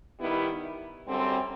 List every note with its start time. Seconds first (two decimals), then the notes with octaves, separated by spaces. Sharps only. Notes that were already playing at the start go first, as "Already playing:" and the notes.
0.19 D#3 G3 B3 E4
1.07 F#2 D3 G3 C4